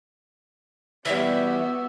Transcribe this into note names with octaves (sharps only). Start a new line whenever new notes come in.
E3 G3 B3 F#4 G4 E5 E6